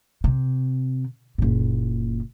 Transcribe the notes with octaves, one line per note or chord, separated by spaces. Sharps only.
C3
F#1 A#2